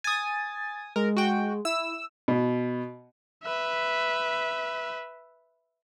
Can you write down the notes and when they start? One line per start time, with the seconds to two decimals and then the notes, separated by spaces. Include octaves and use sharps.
0.04 G#5 D#6 A6
0.96 G#3 A#4
1.17 F#4 G5
1.65 E4 E6
2.28 B2
3.43 B4 E5